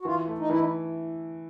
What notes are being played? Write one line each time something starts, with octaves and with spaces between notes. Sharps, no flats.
F#4
E3 F4
A3
D#4
E3 E4
D#4